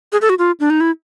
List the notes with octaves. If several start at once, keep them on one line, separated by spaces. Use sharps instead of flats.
G#4
A4
F#4
F4
D4
D#4
E4